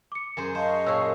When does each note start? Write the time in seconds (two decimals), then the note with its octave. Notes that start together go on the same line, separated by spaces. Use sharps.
0.12 D6 C#7
0.37 F#2 G#4 C5
0.55 C5 D#5 F5 A5 C#6
0.86 A#2 G#4 C#5 E6